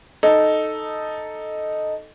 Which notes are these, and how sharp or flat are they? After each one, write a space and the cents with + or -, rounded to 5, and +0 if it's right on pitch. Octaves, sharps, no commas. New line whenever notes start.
D#4 -5 A4 -5